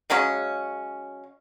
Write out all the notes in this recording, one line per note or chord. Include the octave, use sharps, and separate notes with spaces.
C#3 F#3 G#3 C#4